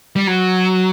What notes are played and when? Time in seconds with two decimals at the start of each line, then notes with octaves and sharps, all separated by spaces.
0.16 G3
0.27 F#3